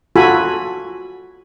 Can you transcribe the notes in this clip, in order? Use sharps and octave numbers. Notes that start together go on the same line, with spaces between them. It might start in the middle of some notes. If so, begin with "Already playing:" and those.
F4 F#4 A4 G#5 B5